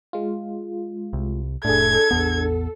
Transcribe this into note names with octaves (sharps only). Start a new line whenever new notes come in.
G#3 F4
C2
F1 A2 D4 G#4 A4 G#6
A1 E2 B3